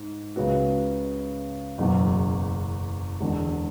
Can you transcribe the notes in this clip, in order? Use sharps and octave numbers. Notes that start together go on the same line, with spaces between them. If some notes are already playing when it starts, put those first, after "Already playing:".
Already playing: G#2
C#2 C#3 G#3 B3 F#4
F#1 E2 B2
E1 E2 D3 G#3